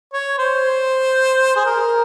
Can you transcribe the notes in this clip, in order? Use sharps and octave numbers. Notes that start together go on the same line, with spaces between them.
C#5
C5
G#4
A#4